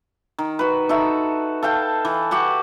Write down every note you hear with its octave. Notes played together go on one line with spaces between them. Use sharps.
D#3
F#4 B4
D#4 F#4 A4 E5
A4 F5 G5 A5
E3
F#4 G4 F#5